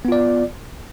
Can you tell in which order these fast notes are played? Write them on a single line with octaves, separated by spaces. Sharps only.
B3 F4 D5